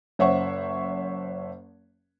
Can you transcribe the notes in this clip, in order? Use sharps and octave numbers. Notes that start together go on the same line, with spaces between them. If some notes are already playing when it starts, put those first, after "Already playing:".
F#1 C5 C#5 E5 F#5 C#6